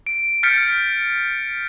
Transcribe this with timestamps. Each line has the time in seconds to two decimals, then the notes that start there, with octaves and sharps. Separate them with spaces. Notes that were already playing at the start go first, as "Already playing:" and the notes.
0.07 D7
0.43 F6 G6 A6 B6 C#7